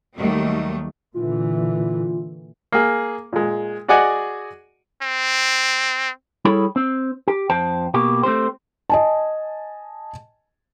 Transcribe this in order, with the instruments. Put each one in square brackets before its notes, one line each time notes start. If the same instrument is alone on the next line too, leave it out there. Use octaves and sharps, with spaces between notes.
[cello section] D#2 D#3 F#3 G3 A3
[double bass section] A#2 D3 E3 [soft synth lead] F4
[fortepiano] A#3 G#4
A#2 G#3
F#4 G#4 D5 D#5 F#5 G#5
[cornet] C4
[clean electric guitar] G3 E4 G#4 A4 C#5 B5
C4
G4
F2 C5 G5 A5
B2 A#3 G4
A3 C4 G4 C5
[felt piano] D#5 G#5 A5